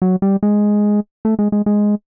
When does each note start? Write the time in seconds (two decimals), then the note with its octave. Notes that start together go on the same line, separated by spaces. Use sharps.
0.02 F#3
0.22 G3
0.43 G#3
1.25 A3
1.39 G#3
1.52 G#3
1.66 G#3